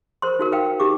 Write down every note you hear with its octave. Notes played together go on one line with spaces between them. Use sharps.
A#4 C5 C6
D#4 F#4 A#4
A#4 B4 F5 G5
A#4
D#4 G4 D6